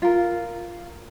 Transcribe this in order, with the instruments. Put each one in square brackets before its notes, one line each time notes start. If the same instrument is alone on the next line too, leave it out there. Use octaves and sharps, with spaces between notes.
[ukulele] F4 A#4